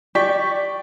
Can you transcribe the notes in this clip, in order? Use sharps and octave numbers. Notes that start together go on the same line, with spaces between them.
G4 D5 C#6 B6